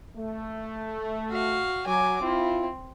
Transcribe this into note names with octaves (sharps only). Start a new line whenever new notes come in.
A3
F#4 F5
F#3 G#5 D6
C4 E4 F4